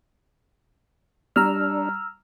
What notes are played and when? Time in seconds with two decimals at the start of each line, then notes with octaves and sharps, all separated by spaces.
1.36 G3 D4 A#5 E6 F6